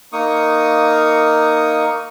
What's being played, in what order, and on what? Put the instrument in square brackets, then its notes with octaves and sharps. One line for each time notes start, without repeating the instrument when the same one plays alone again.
[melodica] A#3 D#4 C#6 D#6